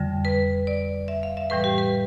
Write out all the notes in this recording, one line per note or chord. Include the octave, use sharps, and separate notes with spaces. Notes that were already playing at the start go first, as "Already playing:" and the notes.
Already playing: F2 D3 G3
B4
D5
E5
F5
E5
A2 E3 G3 B4
G4
B4